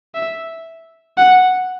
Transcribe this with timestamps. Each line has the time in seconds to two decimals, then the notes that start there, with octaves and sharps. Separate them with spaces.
0.15 E5
1.18 F#5